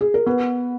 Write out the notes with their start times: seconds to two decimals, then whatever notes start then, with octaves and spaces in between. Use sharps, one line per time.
0.01 G#4
0.14 A#4
0.27 B3 B4